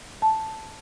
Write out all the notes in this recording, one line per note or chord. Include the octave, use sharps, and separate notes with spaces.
A5